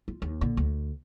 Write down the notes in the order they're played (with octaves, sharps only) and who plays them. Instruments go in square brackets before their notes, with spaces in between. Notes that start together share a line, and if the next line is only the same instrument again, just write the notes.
[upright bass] F4
D#2
A#1 D3
D2